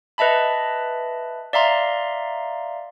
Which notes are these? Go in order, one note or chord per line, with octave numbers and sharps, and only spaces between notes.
B4 D#5 E5 A5 B5
D5 E5 F5 A#5 C6